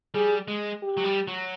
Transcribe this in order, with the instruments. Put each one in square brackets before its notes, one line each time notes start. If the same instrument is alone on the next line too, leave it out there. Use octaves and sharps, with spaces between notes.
[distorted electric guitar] G3 [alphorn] G#4
[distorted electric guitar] G#3
[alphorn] G4
[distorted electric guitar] F#3
G3
F#3